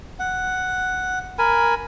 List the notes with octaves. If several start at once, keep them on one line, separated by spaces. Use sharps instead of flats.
F#5
A#4 G#5 B5